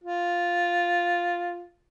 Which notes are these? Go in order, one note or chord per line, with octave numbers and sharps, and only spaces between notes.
F4